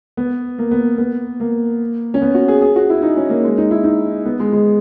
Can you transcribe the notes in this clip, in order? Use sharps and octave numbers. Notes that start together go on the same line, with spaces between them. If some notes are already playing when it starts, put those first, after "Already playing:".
B3
A#3
B3
B3
A#3
C#4
B3
F#4
G#4
G#4
F#4
E4
D#4
C#4
A#3
G#3
D#4
E4
D#4
B3
G#3
G#3